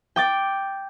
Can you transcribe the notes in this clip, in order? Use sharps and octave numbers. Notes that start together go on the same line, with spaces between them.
G5 D6 A6